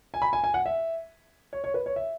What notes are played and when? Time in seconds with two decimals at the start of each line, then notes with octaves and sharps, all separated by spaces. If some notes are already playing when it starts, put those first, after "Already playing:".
0.14 G#5
0.22 B5
0.33 G#5
0.44 G#5
0.54 F#5
0.66 E5
1.53 C#5
1.64 C#5
1.74 B4
1.86 C#5
1.96 E5